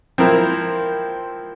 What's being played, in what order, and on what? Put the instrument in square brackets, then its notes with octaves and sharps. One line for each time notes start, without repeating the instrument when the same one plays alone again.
[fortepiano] F3 C4 E4 A#4